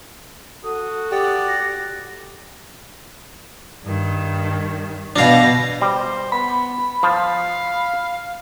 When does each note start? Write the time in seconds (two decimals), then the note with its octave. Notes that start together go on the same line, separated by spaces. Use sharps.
0.64 F#4 A4 D#6
1.12 G4 D5 F#5
1.48 A#6
3.85 G2 D#3
5.16 B2 B3 D4 F5 A#6
5.81 G3 C5
6.32 B3 B5
7.03 F3 F5